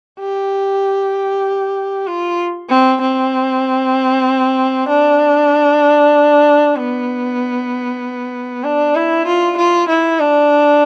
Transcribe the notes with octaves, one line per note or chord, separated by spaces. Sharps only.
G4
F4
C4
C4
D4
B3
D4
E4
F4
F4
E4
D4